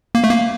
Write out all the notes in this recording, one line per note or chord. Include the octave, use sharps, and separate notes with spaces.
A#3
A3
A#3